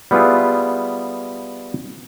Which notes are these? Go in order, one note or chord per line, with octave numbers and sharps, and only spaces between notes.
G3 B3 E4 F4 G#4